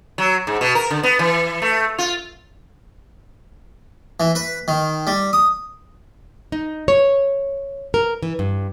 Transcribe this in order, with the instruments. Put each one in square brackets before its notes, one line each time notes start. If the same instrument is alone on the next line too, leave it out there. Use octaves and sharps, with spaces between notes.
[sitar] F#3
G#2
B2
A#4
D3
B3
E3
A3
F4
[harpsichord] E3
B4
D#3
G3
D#6
[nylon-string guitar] D#4
C#5
A#4
E3
G2